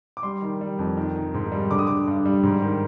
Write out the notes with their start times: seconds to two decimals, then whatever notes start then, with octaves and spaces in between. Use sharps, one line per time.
0.17 D6
0.23 G3 C6
0.42 D#3
0.61 G3
0.79 F2
0.97 D#3
1.16 D#3
1.34 G#2
1.52 G3
1.71 D3 D6
1.79 D#6
1.87 D3 D6
2.08 G2
2.25 G3
2.43 G#2
2.62 D#3